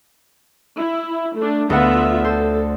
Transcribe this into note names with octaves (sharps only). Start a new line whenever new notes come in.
E4
A3 D4
D2 B3 F4 E5 F#5
A4 C5